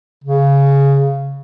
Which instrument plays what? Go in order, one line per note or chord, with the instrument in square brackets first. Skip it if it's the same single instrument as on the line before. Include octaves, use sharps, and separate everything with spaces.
[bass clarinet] C#3